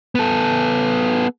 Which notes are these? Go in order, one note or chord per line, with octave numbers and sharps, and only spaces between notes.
B3 A4